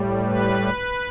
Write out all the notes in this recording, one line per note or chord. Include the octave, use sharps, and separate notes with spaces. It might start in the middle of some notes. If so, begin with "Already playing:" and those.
Already playing: A2 G3
B4